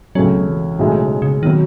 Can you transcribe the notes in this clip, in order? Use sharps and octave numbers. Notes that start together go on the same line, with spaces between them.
C#2 B2 F#3 A3 C#4
E3
B1 A2 D#3 G#3 D#4
C#3
C#3
B2 D#3 F#3